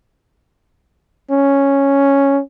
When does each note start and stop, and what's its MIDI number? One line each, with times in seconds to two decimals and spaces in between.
1.31 2.40 61